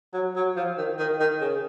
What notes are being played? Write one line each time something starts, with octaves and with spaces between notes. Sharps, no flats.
F#3
F#3
F3
D#3
D#3
D#3
C#3